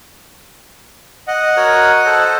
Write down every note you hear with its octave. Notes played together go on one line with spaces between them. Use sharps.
D#5 F#5
F#4 A#4 C#5
A4 C5